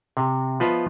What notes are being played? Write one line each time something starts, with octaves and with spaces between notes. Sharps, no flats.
C3
F3 B3 F4 B4 D#5 E5